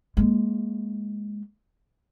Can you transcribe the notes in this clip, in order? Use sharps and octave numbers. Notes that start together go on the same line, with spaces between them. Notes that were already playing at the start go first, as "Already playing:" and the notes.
G#3 A#3